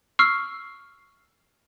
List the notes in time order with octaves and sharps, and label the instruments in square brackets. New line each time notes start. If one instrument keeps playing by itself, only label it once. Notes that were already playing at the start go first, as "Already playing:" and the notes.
[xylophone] C#6 E6 F6 C7